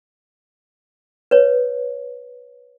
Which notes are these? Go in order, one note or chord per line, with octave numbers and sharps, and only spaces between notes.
B4 C#5